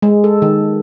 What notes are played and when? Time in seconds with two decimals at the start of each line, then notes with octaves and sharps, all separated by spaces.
0.02 G#3
0.24 A4
0.42 D#3